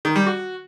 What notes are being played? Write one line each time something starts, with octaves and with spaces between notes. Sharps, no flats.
D#3
G3
F#4